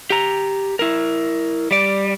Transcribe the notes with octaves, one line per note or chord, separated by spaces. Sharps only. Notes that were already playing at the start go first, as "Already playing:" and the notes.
G4 A#5
E4 A#4
G3 D5